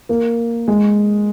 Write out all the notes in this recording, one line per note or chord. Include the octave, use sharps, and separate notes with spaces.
A#3
G#3